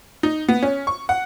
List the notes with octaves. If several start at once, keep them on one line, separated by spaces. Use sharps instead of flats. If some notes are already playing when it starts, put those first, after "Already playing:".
D#4
B3
C#4
C#6
F#5